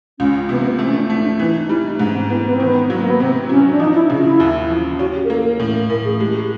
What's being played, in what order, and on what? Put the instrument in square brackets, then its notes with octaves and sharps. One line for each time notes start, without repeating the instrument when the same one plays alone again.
[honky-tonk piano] C#2 [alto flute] C#4
[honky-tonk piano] C3 [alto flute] B3
[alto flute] A#3
B3
[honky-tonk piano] A3 [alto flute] C4
[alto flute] C#4
D4
[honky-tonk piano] A3
[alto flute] D#4
D4
[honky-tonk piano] E3 [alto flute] C4
[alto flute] D#4
D#4
[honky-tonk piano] G3 [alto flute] E4
[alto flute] D#4
[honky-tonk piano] G#2 [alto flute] D4
[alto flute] C#4
C4
[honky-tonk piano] E3 [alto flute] B3
[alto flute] B3
C4
[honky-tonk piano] D#3
[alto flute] B3
[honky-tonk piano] F#3
[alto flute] A#3
B3
[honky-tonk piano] C3 [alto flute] C4
[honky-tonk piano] F#3 [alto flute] C#4
[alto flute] D4
[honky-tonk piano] F3 [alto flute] D#4
[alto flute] E4
[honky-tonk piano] C#3 [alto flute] D4
[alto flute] F4
E4
[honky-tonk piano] D#2
F3
[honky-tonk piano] C#4 [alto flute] F#4
[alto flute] G4
A#4
[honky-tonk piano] A#3 [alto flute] A4
[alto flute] A#4
[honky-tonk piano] A2
[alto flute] A#4
[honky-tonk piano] A2 [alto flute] A#4
[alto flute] G#4
[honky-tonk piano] G#3 [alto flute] G4
[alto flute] G4